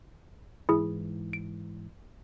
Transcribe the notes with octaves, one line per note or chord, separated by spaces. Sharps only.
G#2 E3 E4 G#4
D7